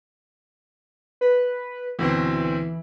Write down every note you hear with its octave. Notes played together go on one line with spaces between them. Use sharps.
B4
D2 B2 E3 C4